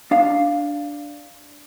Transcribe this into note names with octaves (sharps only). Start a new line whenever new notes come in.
D4 F5